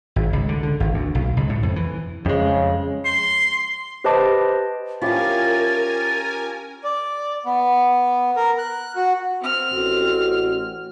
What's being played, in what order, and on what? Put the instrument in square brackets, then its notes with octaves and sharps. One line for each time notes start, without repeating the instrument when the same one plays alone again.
[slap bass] G#1
C#2
D3
D3
G#1
D2
B1
C#2
A2
F2
E3
[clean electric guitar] F2 G#3 [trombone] C#3
[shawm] C6
[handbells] G4 B4 C5 D#5 A5 D6
[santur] F3 C#4 G4 [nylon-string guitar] E4 F4 [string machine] A#4 G#5 [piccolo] A6
[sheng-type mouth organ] D5
B3
A#4
F#6
F#4
[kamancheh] C4 F6
[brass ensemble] A1 F#4